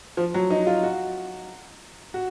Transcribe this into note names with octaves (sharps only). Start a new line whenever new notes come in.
F3
F#3
D#4
F4
F#4
F#4